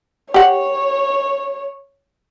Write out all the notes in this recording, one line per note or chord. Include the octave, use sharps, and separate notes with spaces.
G4 C#5 F#5